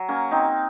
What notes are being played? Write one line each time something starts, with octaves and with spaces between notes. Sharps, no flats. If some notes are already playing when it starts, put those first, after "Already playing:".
Already playing: F#3
A#3 C#4
C4 D#4